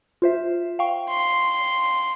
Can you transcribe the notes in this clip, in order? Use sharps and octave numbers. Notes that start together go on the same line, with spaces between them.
F4 C5 E5
F5 G5 C#6
C6